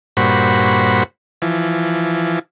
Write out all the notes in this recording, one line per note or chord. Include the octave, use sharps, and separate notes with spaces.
G2 A#2 F#4 C5 B5 C#6
E3 F3